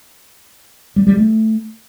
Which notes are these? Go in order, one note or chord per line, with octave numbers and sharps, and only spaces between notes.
G3
G3
A3